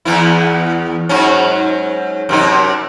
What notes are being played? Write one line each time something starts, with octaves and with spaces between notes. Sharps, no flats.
E2 B3 E4
G#2 F#3 C#4
F#2 C3 D#4